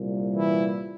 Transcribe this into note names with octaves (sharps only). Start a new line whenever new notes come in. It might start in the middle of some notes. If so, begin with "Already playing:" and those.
Already playing: C2 A#2 G3
E3 E4